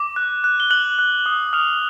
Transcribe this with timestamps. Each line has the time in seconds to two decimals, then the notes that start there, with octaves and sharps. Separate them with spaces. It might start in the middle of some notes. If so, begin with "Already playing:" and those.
Already playing: D6
0.16 F#6
0.44 F#6
0.60 G7
0.71 F#6 F#7
0.99 F#6
1.26 D#6
1.53 D#6 F6 F7